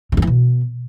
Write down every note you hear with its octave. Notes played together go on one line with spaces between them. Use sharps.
C#3
G2
E3
B2